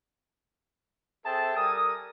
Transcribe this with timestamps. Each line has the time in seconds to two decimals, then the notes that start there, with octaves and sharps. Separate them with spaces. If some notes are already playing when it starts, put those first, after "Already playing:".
1.26 C4 G#4 A4 E5 G5 A5
1.57 G3 A4 A#4 G#5 D#6